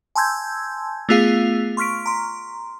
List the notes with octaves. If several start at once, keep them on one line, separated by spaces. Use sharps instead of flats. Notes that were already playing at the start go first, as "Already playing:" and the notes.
G#5 A5 C6 E6 G6 G#6
A3 B3 F4 G#4 F5
C6 C#6 F6 B6 D7
A#5 C6